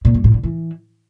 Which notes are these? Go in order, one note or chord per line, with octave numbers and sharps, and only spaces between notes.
A#2
G2
A2
D3
E3